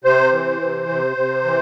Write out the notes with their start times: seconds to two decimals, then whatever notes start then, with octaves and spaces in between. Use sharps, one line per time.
0.04 C3 C5
0.32 E3
0.61 C3
0.89 C3
1.17 C3
1.45 E3